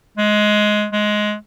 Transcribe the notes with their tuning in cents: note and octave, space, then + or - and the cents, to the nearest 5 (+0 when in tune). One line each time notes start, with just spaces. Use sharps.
G#3 +15
G#3 +15